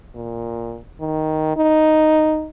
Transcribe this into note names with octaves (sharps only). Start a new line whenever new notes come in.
A#2
D#3
D#4